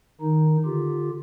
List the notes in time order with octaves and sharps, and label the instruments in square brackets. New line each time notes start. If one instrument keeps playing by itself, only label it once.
[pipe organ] D#3 D#4
D3 F4 G4